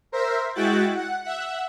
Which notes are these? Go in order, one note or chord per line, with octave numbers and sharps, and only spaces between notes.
A#4 C5 E5
G#3 E4 F#4 G5 F#6 A6
F#5
E5 F#5